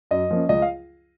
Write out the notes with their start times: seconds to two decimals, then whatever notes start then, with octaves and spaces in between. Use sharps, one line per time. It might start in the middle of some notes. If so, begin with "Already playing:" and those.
0.11 F#2 D#5
0.30 F3 A#3 C#4
0.49 C#2 D#5
0.62 F5